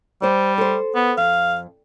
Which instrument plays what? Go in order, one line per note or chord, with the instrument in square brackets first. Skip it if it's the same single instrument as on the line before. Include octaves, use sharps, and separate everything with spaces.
[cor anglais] G3 [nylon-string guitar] C5 D5
[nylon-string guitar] A4 C5
[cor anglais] B3
[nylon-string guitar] F2 [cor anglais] F5